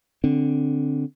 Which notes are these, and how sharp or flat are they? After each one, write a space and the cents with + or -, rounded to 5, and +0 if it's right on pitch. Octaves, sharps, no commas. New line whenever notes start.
D3 +0 C4 +0